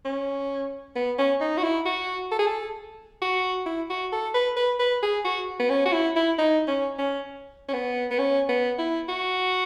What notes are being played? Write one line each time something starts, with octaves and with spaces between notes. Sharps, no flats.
C#4
B3
C#4
D#4
F#4
E4
F#4
A4
G#4
A4
F#4
E4
F#4
A4
B4
B4
B4
G#4
F#4
B3
C#4
F#4
E4
E4
D#4
C#4
C#4
C#4
B3
B3
C#4
B3
E4
F#4